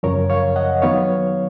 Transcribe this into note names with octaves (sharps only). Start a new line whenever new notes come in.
F#2 C#3 F3 A#4 C#5
C#5 F5
D#5 F#5
D#3 F#3 B3 C#5 F5